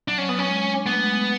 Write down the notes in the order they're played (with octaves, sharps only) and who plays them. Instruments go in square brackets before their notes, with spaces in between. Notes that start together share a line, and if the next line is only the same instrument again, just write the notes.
[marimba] F#3 [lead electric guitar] D4
[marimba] F#3 [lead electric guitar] C#4
[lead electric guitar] B3
[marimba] F#3
[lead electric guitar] C#4
[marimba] G#3
D4
[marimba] A3 [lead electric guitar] B3
[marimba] G#3
G#3